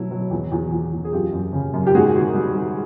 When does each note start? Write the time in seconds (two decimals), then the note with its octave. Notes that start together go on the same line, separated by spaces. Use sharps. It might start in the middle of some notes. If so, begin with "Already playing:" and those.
Already playing: B2 F#3 A3 E4
0.11 F#3
0.31 E2
0.52 E2
0.72 E2
0.92 E2
1.05 G#4
1.13 F#2 F4 G4
1.33 F#2
1.53 C#3
1.74 F#2
1.87 G4
1.94 G#2 F#4 G#4
2.15 D#3
2.35 G3
2.55 G3